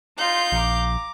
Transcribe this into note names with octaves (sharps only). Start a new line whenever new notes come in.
D#4 F4 F5 C6 G6
A#1 A#5 D6